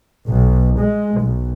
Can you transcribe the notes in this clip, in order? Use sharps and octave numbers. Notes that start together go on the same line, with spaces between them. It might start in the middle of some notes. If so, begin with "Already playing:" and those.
B1
G#3
B1